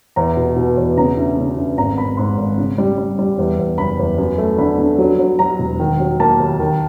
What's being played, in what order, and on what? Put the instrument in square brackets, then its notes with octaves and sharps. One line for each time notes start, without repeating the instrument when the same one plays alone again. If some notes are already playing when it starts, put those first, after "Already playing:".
[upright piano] E2 A#5
B2
B2
E2
C#3 A#5
D2
C#3
D2
G#1 A#5
G#1 B5
G#2 C6
G#1
C#3
G3
G3
G3
E2
E2
F#1 B5
E2
F#2
A3
D3 B5
D3
F#3
F#3
F#3 A#5
E1
D#3
F#3
A#3 A5
D#2
D#3